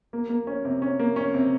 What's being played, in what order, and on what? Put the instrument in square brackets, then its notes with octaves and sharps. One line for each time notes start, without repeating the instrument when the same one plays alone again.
[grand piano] A#3
A#3
C#4
C3
C#4
A#3
C#4
C3